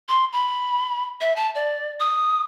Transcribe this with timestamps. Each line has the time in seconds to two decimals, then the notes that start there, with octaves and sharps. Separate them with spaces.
0.08 C6
0.33 B5
1.21 E5
1.36 A5
1.55 D5
2.00 D#6